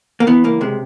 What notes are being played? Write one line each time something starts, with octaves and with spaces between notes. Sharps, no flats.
A#3
E3 B3
C#2 A#3
C3 G#3